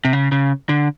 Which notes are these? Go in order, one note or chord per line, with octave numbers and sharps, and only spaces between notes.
C3
C#3
C#3
D3